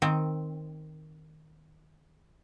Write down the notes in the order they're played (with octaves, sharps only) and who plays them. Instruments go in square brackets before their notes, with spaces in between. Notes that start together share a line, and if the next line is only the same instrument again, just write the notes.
[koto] D#3 C4